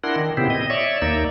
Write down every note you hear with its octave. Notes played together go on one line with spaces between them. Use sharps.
D4 E4 A#4 F#5 C6
D#3
A#2 C#3 B3 C4 E4 G4
D#5
C#5 D5 E5
D#2 A#3 D#4 D5 E6